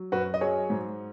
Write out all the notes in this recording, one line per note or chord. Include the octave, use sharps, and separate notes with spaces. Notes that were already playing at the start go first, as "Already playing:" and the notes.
Already playing: F#3
F#2 F#4 B4
D#5
F#3 G#4 C#5
G#2